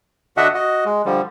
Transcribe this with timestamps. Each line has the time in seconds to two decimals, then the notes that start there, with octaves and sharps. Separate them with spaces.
0.37 D3 D4 F#4 D#5 E5 F#5
0.55 F#4 D#5
0.85 G#3
1.05 D3 F3 G3